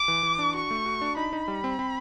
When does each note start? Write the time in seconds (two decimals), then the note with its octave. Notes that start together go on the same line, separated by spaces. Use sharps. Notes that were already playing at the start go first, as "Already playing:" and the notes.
Already playing: D6
0.08 E3
0.23 E3
0.39 D4
0.54 F#4 C#6
0.71 A3
0.86 F#4
1.01 D4
1.17 D#4 B5
1.33 D#4
1.48 G3
1.64 C4
1.79 C4